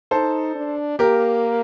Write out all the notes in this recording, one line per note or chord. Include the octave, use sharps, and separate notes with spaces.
D#4 A4 C5
D4
A#3 G4 A#4